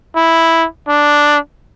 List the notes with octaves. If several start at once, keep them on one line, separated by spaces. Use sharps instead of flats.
E4
D4